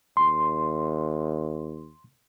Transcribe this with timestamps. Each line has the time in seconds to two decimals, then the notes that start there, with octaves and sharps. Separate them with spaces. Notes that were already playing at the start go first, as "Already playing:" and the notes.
0.17 D#2 C6